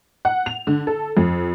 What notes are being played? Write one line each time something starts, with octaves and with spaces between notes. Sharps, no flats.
F#5
F7
D3
A4
F2